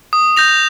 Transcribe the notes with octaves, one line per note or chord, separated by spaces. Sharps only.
D#6
G6 A#6 F7